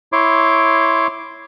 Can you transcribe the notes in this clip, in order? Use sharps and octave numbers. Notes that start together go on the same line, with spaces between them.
E4 C#5 C6 D6